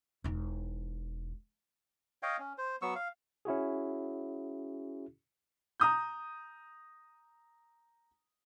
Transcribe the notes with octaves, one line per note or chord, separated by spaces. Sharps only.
E1 D#4
C#5 D#5 F5 G5
C#4
C5
F#3 B3 C#6 E6
F5
C#4 E4 F#4 G#4
A#5 D#6 G6